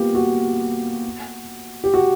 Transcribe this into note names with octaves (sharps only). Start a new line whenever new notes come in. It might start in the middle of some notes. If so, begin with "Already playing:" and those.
Already playing: A#3 B3 F4 G4
F#4
G4
F#4